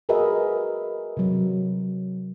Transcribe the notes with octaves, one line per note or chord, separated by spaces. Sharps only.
F#4 G#4 A#4 B4 D#5 E5
C3 F#3